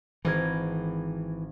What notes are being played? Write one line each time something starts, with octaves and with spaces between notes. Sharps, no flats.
G#1 E3 A#4 G#6